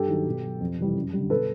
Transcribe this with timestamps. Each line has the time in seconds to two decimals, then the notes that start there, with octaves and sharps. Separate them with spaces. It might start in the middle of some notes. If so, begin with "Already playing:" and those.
Already playing: G2 G4 A4
0.08 D#3 F#3
0.26 B2
0.44 F#3
0.60 F2
0.78 C3 E3 G3
0.95 F#2
1.13 D3 G3
1.30 B2 A4 B4